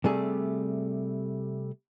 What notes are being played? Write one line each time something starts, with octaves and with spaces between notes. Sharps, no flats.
C3 G3 A3 G#4